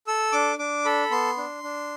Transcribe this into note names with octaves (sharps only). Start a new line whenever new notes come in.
A4 E6
D4 D6
D4 D6
A4 B5
B3 C6
D4
D4